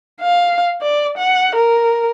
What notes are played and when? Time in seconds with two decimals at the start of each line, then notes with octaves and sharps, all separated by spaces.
0.21 F5
0.82 D5
1.17 F#5
1.55 A#4